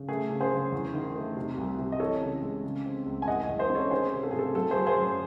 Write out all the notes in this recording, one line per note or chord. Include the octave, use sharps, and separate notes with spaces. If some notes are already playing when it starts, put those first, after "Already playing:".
Already playing: C#3
A3 G#4
C#3
G#4 C5
C#3
E2
D#3
A3
C3
C2
C3
D#5
E3 A4 C#5
C#3
G#3
C#3
C4
C#2
G#5
E2 D#5 F#5
E2
C5 D#5
C#4
A4 C#5
D#3 G#4 C5
C3
A4
C3 G#4
A4
F#3 A4
G#4 C5
F#3
G#4 C5
F#2